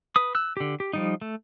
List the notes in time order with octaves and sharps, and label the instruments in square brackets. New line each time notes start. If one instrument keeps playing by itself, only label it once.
[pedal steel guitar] B4 D#6
E6 F#6
D3 G4
G4
F3 G3 D#4
A3